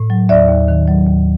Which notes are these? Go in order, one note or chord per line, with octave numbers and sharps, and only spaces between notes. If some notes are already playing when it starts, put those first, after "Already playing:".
Already playing: A2
F#3
D#2 D5 E5
D#2
D#3
F#3
D#2